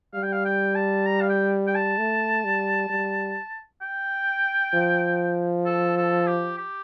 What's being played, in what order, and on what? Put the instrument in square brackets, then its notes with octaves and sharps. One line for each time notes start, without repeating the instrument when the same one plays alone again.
[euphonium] G3 [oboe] F5
[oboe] G5
F5
G5
A5
A#5
F5
G5
G5
A5
[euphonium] A3
G3
G3
[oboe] G5
[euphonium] F3
[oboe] A4
A4
G4
G4